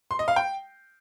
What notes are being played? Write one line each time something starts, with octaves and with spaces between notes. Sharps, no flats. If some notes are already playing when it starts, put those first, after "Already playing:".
C6
D#5
F5
G5